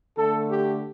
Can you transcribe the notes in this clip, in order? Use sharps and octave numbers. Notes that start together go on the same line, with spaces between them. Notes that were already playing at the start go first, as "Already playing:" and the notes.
D3 A3 A4
G4